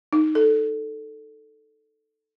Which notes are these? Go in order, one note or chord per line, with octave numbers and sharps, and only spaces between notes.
D#4
A4